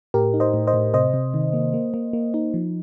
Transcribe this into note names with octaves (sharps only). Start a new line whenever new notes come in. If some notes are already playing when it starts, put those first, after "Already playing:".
A2 G4 A#4
D#4
C5 D#5
A2
C5 D#5
A2
C3 C5 D#5
C3
D#3
A#3
A#3
A#3
A#3
D#4
F3